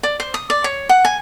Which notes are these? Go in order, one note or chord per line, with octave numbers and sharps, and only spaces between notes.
D5
C5
D#6
D5
C#5
F#5
G#5